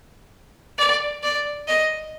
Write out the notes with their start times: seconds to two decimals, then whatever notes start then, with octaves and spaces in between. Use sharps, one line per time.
0.78 D5
1.23 D5
1.68 D#5